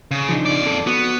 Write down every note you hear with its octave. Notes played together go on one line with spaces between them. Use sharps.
C#3
F3 D4 D#4
F2 D5
A4
B3 F#4